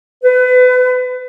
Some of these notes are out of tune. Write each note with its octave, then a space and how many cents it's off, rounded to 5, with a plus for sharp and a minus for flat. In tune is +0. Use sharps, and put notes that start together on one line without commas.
B4 +30